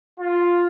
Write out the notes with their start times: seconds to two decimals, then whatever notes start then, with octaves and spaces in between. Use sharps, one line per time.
0.21 F4